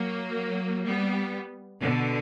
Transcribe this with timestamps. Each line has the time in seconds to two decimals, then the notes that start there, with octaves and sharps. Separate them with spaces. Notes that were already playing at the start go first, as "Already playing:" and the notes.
Already playing: F#3 A#3
0.85 G3 B3
1.82 B2 D3